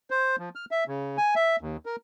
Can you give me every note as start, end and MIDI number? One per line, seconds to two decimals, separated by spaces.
0.10 0.36 72
0.39 0.49 53
0.55 0.65 89
0.71 0.84 76
0.88 1.17 49
1.17 1.34 80
1.35 1.56 76
1.61 1.77 39
1.86 1.96 70